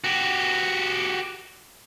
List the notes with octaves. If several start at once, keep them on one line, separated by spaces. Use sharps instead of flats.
F#4 G4